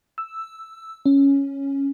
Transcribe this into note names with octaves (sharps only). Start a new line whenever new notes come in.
E6
C#4